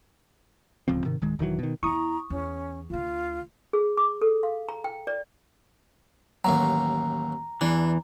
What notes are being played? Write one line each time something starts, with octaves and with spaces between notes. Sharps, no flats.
D1 C#2 F3 C4
G#2 C3 D#3
D1 D#3 G#3
E1 D#3 E3 F#3
B2 D#3
E2 E4 A#5 C#6 D#6
E2 C#4
D2 D3 F4
G#4
D6
A4
F5
A#5
G5
D5
A1 D#2 F#3 A#5
E2 E3 D4